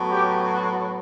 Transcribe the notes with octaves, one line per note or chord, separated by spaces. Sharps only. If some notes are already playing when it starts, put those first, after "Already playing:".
Already playing: A2 F#3 B3
G4
F#4